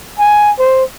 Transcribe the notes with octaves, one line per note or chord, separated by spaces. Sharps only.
G#5
C5